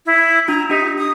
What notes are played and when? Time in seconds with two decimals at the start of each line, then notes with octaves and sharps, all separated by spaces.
0.06 E4
0.48 D4 F4 A#5
0.70 D4 D#4 G4 B6
0.98 D#6